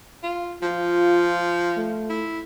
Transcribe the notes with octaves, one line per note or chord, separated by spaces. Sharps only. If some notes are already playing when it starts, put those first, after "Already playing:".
F4
F3 F4
A3
E4